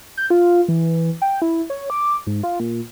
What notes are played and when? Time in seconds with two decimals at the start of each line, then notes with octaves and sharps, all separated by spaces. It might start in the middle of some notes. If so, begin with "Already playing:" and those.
0.17 G6
0.30 F4
0.68 E3
1.22 G5
1.42 E4
1.70 C#5
1.90 D6
2.27 G#2
2.43 F4
2.60 A#2